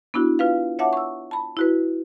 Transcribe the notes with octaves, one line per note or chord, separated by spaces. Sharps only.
B3 D4 E4 F#4
F4 B4 F5
C#5 E5 F#5 A5 D6
C#6 E6
A5 B5
E4 F#4 B4